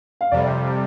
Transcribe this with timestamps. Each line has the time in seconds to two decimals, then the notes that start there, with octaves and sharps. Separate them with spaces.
0.21 F5
0.32 F2 C3 G3 D5